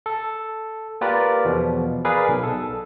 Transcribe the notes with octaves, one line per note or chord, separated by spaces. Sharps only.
A4
A#3 F4 G4 A#4 B4 D5
E2 B2 F3
G#4 A#4 B4 D5 F5
B1 B2
A4